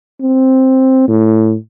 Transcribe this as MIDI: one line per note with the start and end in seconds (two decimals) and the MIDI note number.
0.21 1.06 60
1.08 1.55 45